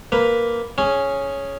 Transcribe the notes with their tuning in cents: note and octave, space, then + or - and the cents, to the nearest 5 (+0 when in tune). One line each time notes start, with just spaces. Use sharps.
A#3 +0 B4 +0
C#4 +0 G#4 +0